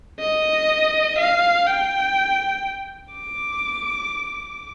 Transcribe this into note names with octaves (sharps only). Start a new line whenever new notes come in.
D#5
F5
G5
D6